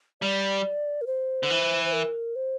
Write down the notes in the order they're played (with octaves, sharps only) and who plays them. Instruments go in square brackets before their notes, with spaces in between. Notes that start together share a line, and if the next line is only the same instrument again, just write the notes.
[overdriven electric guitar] G3 [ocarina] D5
[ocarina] A#4
C5
[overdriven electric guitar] D3
E3
[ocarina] C5
A#4
C5